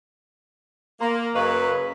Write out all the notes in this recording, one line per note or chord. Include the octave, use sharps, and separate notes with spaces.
A#3 A#4 A#5 C6
F#2 C#3 B4 D#5 F5 C#6